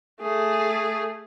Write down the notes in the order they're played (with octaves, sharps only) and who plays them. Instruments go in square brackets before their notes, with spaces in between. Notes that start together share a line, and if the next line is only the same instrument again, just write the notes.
[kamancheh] A3 G#4